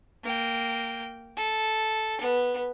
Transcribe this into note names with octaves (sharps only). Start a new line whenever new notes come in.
A#3 G5
A4
B3